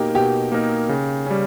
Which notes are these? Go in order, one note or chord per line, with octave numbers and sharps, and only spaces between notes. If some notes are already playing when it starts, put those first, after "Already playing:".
Already playing: B2 A#3 D#4 G4 A#4
B2 G4
A#3 D#4 A#4
C#3
G3 C#4